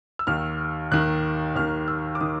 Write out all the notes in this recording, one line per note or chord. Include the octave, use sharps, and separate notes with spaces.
E6
D#2 D#3 F6
D#2 D#3 F#6
D#2 D#3 F6
E6
D6
D#3 D#6